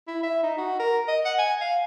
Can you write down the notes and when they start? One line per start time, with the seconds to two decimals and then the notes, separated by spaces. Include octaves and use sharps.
0.08 E4
0.23 E5
0.43 D#4
0.58 F#4
0.80 A#4
1.08 D#5
1.25 F#5
1.39 G#5
1.61 F5